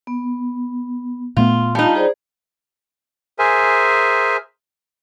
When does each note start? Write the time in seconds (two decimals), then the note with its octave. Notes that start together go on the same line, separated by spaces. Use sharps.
0.07 B3
1.37 A#2 A3 B3 F4
1.75 G3 D#4 F4 F5 A5
1.95 G#4 C5 D5
3.39 G#4 A#4 C5 E5 G#5